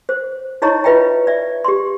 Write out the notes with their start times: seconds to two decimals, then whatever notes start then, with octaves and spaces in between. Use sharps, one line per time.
0.09 C5
0.62 D#4 E4 C#5 D#5 A#5 C#6
0.84 F4 B4 D#5 E5 G5 A#5
1.27 D5 E5
1.64 G4 C6